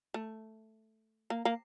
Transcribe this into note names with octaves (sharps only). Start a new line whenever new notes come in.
A3
A#3
A#3